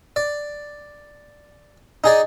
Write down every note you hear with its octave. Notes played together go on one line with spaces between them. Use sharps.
D5
D#4 G#4 D5